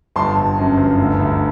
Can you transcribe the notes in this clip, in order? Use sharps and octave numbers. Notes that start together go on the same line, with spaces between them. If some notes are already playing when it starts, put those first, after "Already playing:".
G1 A5 C6
G1
F#2
G1
D2
D2